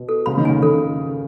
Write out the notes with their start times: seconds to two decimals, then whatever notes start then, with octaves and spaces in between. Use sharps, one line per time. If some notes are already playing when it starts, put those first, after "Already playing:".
Already playing: B2
0.09 A4
0.26 C#3 B5
0.38 D#3
0.45 C#3 G#5
0.62 D#3 A4